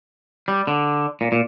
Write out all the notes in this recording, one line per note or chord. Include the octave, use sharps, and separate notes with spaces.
G3
D3
A#2
A#2